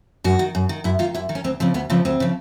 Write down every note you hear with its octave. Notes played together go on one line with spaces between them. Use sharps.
F#2 F#4
D#3
F#2
D#3
F#2 E4
D#3 F4
F#2 E4
D#3
C#4
D2 C4
C#3 F3 C4
D2 B3
C#3 F3 C4
D2 C4
C#3 F3